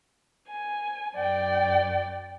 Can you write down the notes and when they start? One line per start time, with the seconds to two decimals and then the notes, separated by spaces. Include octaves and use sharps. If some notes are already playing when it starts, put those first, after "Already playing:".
0.50 G#5
1.15 F#2 D5 G5